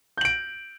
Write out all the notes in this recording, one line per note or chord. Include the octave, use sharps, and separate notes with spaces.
G6 D7 F#7